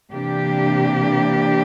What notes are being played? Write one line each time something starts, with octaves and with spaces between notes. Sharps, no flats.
C3 E3 A#3 D4 G4